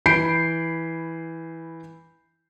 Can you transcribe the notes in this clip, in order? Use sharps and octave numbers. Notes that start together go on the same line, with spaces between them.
E3 B5 G6 C7 D7